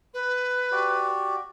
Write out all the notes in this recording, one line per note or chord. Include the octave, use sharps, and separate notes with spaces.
B4
F#4 G4 D5